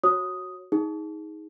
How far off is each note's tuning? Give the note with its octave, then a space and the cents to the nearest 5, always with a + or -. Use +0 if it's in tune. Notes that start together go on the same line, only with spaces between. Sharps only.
F#4 +0 C#5 -20 D#6 +0
D#4 +25 G#4 +0